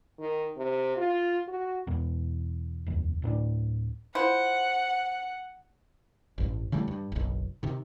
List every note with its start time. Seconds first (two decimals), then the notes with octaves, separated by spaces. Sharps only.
0.19 D#3
0.57 C3
0.97 F4
1.48 F#4
1.87 E2 B2
2.87 F1 D#2
3.22 D1 A2 B3 D4
4.15 E4 F4 C5 F#5
6.38 A1 G2
6.72 C#3 E3 G3 A3
6.88 G2
7.12 F#1 B1
7.63 C3 D#3